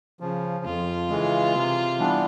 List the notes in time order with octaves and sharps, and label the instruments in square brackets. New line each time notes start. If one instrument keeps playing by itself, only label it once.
[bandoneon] C#3 F3
[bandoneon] F2 [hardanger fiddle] F4
[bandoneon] C#3 E3 G#3
C3
E3 G3 B3 D4